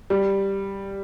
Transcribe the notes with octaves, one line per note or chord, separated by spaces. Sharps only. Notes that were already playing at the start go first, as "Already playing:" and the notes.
G3